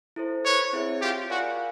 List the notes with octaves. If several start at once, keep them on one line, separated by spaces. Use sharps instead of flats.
E4 A4 C5
B4 C#5
C4 E4 G#4 C#5 E5
F4 G4
F4 F#4 A#4 D5 F5 G#5